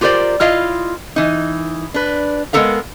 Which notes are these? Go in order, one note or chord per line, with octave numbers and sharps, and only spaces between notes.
F4 G4 A#4 C5 D5
E4 F4 D#5 F5
E3 D#4
D4 B4
G#3 B3 E4 A4 A#4 F5